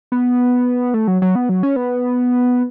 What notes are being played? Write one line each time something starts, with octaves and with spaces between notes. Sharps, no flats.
B3
A3
F#3
F#3
B3
F#3
C#4
B3